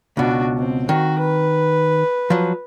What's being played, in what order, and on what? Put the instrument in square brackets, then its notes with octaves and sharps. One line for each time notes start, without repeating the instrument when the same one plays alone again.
[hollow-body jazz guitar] C#2 B2 [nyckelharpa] D4 F#4
[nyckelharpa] C4
[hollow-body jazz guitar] D#3 [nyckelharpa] F#4
[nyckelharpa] B4
[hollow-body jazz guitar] F3 F#3